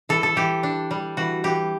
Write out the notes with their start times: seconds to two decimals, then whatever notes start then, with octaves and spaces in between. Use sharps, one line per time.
0.09 E3 A4
0.23 A4
0.36 E3 G4
0.63 D4
0.91 G3
1.17 E3 F#4
1.44 E3 G4